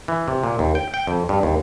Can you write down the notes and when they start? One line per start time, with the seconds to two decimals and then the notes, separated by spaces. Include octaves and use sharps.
0.08 E3
0.28 C3
0.44 A#2
0.59 D#2
0.75 G5
0.94 G5
1.07 F2
1.29 G2
1.43 D#2